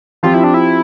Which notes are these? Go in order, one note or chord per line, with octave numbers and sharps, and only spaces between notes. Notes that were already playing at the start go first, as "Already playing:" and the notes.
F3 C4 F4 G4
E4
D4
E4